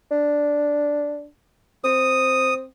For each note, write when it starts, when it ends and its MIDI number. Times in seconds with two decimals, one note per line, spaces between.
0.11 1.25 62
1.84 2.65 60
1.84 2.54 87